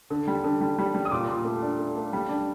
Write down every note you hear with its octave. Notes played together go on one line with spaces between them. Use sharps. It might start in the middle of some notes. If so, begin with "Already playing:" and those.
D3
G3
D3
G3
G3
G3
D#6
A#2 D6
A#2
A3
D4
A3
A3
G3
D4